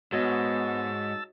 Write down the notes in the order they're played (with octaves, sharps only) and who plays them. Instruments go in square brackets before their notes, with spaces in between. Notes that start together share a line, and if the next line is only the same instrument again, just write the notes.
[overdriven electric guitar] G#2 [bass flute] B3 [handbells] F#4 C#5 D#5 [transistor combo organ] A5 E6